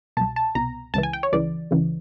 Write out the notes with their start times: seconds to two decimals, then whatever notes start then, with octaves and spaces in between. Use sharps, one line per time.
0.17 C2 B2 A5
0.36 A5
0.55 C2 B2 A#5
0.94 C#2 C#3 E3 A5
1.03 G#5
1.13 G5
1.23 C#5
1.33 C#2 C#3 E3 D5
1.71 C#2 C#3 E3